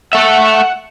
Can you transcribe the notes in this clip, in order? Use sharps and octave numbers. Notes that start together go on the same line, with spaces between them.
A4 E5 F#5